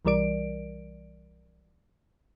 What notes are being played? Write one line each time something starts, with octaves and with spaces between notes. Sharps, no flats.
B1 E3 G3 A#4 D5 D7